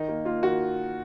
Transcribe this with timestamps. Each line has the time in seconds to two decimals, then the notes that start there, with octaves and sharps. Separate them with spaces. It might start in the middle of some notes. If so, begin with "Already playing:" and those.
Already playing: D#3 D#4
0.09 A#3
0.25 A#3 F4
0.43 D#3 F#4